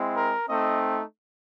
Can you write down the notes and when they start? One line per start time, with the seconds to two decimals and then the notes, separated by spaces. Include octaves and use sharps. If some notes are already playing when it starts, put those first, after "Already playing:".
Already playing: G#3 C4 E4
0.15 A#4
0.48 A3 C4 D#4 D#5